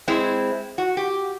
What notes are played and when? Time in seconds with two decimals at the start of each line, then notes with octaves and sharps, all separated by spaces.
0.08 G#3 C4 E4
0.78 F#4
0.97 G4